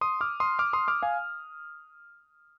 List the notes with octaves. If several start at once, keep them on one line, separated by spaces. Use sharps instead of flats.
C6 D#6
D6 F6
C6 D#6
D6 F6
C6 D#6
D6 F6
F5 G#5